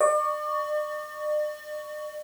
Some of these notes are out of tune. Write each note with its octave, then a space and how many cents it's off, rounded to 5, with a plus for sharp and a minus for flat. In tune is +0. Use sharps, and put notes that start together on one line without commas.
D5 +45 C#6 +20